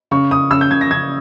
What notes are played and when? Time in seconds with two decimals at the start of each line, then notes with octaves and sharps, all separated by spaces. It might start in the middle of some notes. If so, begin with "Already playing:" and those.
0.11 C#3 C#6
0.31 C#3 D#6
0.51 C#3 E6
0.61 G6
0.71 C#3 G#6
0.81 A#6
0.91 C#3 G#6